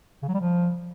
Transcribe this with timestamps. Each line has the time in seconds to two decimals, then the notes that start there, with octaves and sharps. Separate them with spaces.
0.22 C#3
0.28 F#3
0.34 G3
0.40 F3